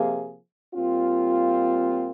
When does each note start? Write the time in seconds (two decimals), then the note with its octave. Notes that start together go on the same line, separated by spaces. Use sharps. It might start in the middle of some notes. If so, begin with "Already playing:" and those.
Already playing: C3 F3 A#3 F4 G#4
0.75 A#2 G3 C4 F4